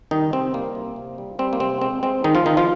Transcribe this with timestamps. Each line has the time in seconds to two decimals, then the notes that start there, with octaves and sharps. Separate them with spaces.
0.11 D#3 G3 D#4
0.33 C3 C4
0.54 G3 A#3
0.75 C3
0.96 C3
1.18 G3
1.39 G3 C4
1.53 A#3
1.60 C3 C4
1.82 G#3 C4
2.03 G#3 C4
2.24 D#3 G#3 D#4
2.35 F3 F4
2.46 D#3 G#3 D#4
2.57 F3 F4